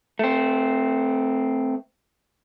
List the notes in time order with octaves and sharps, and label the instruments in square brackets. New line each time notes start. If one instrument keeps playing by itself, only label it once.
[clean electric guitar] A3 C4